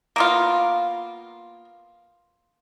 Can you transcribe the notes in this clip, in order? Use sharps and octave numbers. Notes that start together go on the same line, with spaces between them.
A#3 B3 F4